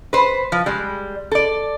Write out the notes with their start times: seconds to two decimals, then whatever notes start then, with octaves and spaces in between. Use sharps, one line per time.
0.13 B4 C5
0.52 F3
0.66 G3 G#3
1.32 A4 D5